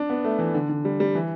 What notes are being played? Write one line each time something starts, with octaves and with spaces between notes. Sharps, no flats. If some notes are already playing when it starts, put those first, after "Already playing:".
Already playing: D4
B3
A3
E3
D3
D3
G3
G3
E3